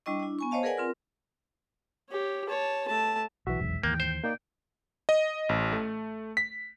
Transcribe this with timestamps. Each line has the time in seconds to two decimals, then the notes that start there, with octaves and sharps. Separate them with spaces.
0.06 G3 D4 E4 D#5 C#6
0.19 D4 E4
0.39 B3 G#5 C#6
0.51 C5 C#5 D#5 F5 A5
0.63 G#4 A#4 B4 D5 F#5 G#5
0.77 C4 F4 A#4
2.10 G4 C#5
2.49 C#5 A5
2.88 A3 A5
3.47 B1 E3 F#4 E5
3.60 F1 B1 E2 G#2
3.83 D#2 E3 A#3 G5
4.00 C5
4.24 A#3 D#4 D5 G5
5.09 D#5
5.49 A1
5.72 A3
6.37 B6